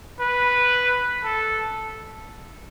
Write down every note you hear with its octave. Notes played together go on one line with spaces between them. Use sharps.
B4
A4